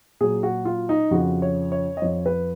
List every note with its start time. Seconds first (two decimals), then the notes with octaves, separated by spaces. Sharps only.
0.20 A#2 F#3 G#4
0.43 F#4
0.65 F4
0.89 D#4
1.11 F2 C#3 F3 F#4
1.42 C#5
1.72 C#5
1.97 D#5
2.02 F2 F3 C#5
2.26 B4